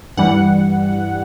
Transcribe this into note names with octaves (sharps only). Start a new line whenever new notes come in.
G2 E3 G3 F#5